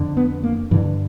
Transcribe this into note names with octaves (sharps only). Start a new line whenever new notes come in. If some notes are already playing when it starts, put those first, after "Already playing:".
Already playing: F2 D3
B3
A#3
G2 D3 E3